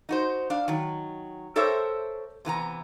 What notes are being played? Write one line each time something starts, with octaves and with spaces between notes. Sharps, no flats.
D#4 F#4 C5
D4 F5
D#3 F#3
G4 A4 A#4 C5 C#5 E5
C3 E3 B3 A#5